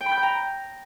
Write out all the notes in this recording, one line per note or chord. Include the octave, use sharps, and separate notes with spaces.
G5
B5
G6
G5
A#5